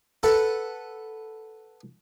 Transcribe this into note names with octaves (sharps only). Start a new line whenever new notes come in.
A4 B4 F#5